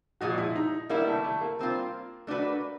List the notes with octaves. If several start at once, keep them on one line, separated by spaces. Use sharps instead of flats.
A#2 F3 G#3 F#4
E4
D#4
G3 A#3 B3 E4
A3
A3
A#3
G3 C4 F4
A3 D4 F#4 B4